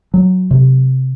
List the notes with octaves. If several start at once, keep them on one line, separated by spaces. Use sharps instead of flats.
F#3
C3